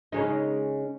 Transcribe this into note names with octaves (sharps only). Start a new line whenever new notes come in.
C#3 G#3 D#4